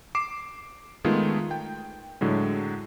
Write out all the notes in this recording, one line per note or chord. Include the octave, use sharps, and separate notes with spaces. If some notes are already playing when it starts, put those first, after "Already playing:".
D6 C7 E7
D#3 G#3 A3 B3 F4 G#4
G5
A2 D3 F#3 G#3